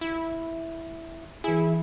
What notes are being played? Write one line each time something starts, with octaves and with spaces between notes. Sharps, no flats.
E4
E3 E4 G#4